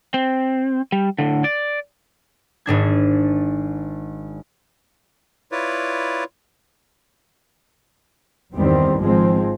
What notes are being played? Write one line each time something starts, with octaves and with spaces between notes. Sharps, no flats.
C4
G3
A2 D3
D5
G#1 G#2 D4 G#6
E4 F4 B4 C#5 D5
E2 G2 D#3 G3 C4
G#1 F3 G#3 C4